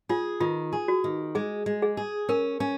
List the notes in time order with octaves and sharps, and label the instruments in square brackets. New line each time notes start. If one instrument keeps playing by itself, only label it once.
[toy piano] F4 [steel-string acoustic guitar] G#4
[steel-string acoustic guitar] D#3 [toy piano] F4
[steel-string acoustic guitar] G#4
[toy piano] F#4
[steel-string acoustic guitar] D#3
[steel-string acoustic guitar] G#3 [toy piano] G#4
[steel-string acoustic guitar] G#3
[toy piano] G#4
[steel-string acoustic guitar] G#4
[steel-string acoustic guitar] C#4 [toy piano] A#4
[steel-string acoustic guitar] C#4